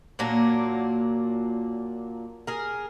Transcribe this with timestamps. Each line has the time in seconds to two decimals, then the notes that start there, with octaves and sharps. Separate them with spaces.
0.19 A#2 F#3 A#3 D4
2.47 G#4 A#4